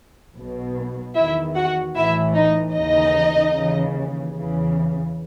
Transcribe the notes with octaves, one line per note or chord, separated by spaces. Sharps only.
B1 B2
E2 D#3 E4 E5
F#4 F#5
A1 A2 E3 E4 E5
D#4 D#5
D#2 C#3 E3 D#4 D#5
D#2 C#3 E3
E2 C#3 E3